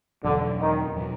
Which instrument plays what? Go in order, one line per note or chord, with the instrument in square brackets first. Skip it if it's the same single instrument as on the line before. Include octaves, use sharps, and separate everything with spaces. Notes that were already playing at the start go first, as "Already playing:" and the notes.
[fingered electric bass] E2 B2 F#3 [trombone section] D3
[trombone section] D#3
[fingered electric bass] B2 F#3